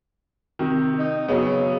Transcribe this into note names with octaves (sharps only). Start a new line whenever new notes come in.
C3 D#3
D#4
C#3 F#3 B3